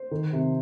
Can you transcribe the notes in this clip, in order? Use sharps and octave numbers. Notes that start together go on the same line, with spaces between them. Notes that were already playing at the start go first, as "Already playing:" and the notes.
Already playing: C5
D#3
C3